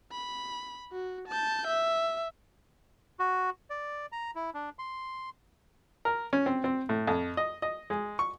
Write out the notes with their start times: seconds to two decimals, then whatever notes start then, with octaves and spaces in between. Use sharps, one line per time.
0.12 B5
0.92 F#4
1.28 A5 G6
1.67 E5
3.19 F#4
3.70 D5
4.12 A#5
4.35 E4
4.54 D4
4.79 C6
6.05 A#4
6.33 C#4
6.46 C4
6.64 C4
6.89 A2
7.07 F2
7.37 D#5
7.62 D#5
7.90 G#3
8.19 C#6